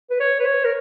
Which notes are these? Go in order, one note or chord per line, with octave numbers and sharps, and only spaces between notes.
B4
C#5
B4
C#5
A#4